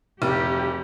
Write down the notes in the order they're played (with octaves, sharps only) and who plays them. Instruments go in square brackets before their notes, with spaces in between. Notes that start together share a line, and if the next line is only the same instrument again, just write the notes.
[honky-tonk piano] F1 [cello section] G4